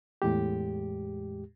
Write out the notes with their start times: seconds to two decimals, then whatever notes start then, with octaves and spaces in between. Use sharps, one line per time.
0.22 E2 A2 G#3 G4